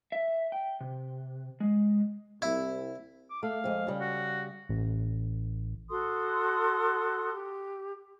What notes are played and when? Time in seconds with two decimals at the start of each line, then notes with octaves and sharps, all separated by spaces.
0.12 E5
0.52 G5
0.81 C3
1.60 G#3
2.42 C2 E4
3.30 D6
3.43 A3 F5
3.64 F2 G#3
3.87 C#3 G3
4.01 F#4
4.69 A1
5.90 F#4 A4 C6 D#6
7.33 G4